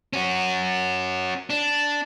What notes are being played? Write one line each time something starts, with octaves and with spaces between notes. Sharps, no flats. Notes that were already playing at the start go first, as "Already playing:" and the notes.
C#4 F#4
D4